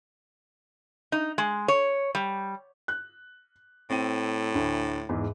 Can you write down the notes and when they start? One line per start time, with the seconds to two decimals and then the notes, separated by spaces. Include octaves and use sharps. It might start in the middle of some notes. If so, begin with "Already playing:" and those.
1.12 D#4
1.38 G#3
1.68 C#5
2.15 G3
2.88 F#6
3.90 A2 C4 D#7
4.55 D2
5.09 E2 G#2